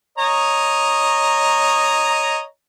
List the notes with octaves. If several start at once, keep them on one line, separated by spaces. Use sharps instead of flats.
C#5 D#5 A#5